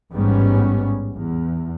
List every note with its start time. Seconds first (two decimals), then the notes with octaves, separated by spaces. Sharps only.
0.11 A1 G#2 G3 B3 C#4
1.15 E2